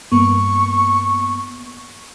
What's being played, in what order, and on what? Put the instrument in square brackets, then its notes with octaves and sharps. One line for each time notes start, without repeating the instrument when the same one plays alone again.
[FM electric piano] G2 A#3 B3 [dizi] C#6